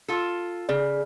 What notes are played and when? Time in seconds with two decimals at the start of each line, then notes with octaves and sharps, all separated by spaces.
0.08 F4 A4
0.69 C#3 G#4 D5